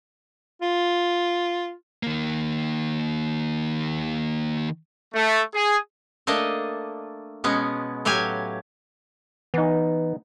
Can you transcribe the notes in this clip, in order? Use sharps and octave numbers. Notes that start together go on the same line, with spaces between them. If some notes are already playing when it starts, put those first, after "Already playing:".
F4
D#3 A#3
A3
G#4
A3 A#3 D4 D#5
B2 G#3 B3 C#4
A2 F#3 G4 F5 G#5
E3 B3 D#4